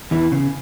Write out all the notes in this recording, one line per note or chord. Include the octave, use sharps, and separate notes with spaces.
E2 E3
C#3